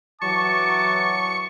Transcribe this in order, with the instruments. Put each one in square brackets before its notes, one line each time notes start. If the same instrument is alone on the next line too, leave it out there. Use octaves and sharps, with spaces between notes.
[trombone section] E3 F#3 [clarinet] A5 [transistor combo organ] C#6 [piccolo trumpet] D6